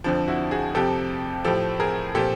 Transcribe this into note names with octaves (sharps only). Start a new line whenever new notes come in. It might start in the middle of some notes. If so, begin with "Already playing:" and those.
F2 D3 F3
E4 F#4
F#4 G#4
F2 C3 F3 G4 A4
A2 F3 G4 A4
G#4 A#4
A#2 F3 G4 A4